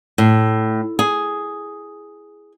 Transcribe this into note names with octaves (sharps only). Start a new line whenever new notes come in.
A2
G#4